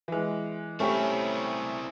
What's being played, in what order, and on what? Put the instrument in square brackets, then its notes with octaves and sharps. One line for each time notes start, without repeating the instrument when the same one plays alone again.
[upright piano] E3 G#3
[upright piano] A3 G4 [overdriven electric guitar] C4 E4 [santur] C#4